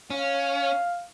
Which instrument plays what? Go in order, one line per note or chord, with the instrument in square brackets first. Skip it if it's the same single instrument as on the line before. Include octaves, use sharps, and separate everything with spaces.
[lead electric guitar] C#4 [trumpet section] F5